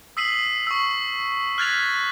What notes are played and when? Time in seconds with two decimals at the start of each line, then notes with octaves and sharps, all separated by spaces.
0.17 D#6 E6 B6 C7 D#7 F#7
0.67 C#6 E6
1.58 F6 F#6 G#6 A6 B6 F7